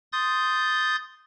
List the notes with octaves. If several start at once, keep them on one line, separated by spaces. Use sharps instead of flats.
C6 D#6 G6 A6